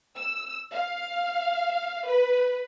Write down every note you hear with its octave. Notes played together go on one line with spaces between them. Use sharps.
E6
F5
B4